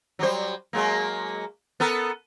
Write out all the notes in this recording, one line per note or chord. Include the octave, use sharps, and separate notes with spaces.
F#3 G3 C5
F#3 G#3 A#3
B3 A4 A#4